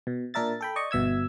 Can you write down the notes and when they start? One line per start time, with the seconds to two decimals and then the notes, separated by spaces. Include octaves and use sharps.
0.07 B2
0.34 A#2 D4 A#4 E5 A6
0.61 A4 G5 B5
0.76 D5 D#5 C#6
0.91 G1 B2 E5 E6 G#6